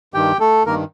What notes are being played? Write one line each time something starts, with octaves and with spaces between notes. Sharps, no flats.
G2 D#3 G4 G5
A3 A4
G2 D#3 A#3 A#4